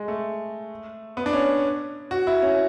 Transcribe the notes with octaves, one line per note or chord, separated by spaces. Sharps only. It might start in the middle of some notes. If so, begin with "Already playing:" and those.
Already playing: G#3
A3
B3
D4
C#4
F#4
E4
C#4